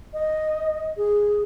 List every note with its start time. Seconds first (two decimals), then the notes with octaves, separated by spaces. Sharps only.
0.13 D#5
0.97 G#4